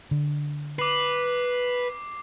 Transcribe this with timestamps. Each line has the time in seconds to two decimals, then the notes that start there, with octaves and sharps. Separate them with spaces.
0.11 D3
0.79 B4 D6 C7